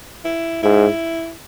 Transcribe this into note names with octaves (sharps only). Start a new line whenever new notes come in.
E4
G#2 E4